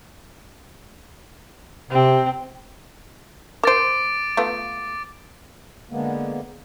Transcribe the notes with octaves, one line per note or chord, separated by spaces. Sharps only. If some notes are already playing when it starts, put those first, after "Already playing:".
C3 C4
A#4 C5 D6 A6 D7
A3 B3 F4
D3 G#3 A#3 B3